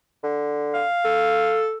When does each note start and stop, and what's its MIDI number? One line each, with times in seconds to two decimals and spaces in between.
0.23 0.83 50
0.74 1.65 77
1.05 1.77 69